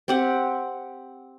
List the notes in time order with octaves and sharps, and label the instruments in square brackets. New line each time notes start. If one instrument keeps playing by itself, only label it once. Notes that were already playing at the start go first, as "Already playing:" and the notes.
[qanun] C4 G4 F#5